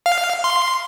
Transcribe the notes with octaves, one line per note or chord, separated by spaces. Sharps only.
F5
C6